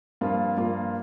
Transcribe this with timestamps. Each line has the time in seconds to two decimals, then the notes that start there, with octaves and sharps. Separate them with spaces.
0.21 G2 F3 A#3 F4
0.57 G2 F3 A#3 F4